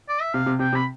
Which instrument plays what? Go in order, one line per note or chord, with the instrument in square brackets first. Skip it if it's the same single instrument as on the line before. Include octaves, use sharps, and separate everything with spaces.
[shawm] D5
E5
[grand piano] C3 [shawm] F5
[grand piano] C3
[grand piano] C3 [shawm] G5
[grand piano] C3
[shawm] B5